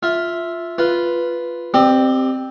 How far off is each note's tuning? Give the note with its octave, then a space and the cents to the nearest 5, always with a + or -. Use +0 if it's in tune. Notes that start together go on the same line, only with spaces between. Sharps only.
F4 +0 E5 +0
F4 -5 B4 +0
C4 +0 G4 +0 D5 +45